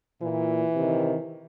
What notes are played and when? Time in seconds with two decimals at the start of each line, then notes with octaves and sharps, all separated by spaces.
0.22 A#2 E3
0.75 C3 D#3